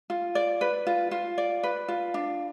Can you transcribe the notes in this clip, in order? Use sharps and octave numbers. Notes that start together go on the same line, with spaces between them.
F4
D5
B4
F4
F4
D5
B4
F4
D4